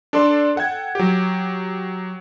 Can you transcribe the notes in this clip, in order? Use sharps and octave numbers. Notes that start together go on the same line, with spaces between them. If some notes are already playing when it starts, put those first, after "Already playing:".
D4 A4 D5 C6
A4 F#5 G5 G#6
F#3 G4